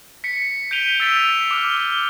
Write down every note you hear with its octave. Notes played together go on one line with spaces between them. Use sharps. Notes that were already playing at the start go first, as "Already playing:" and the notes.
B6 C#7
G6 B6 D7 D#7 F7 G7
E6 G6 A6 B6 D7 F7
D6 F6
G7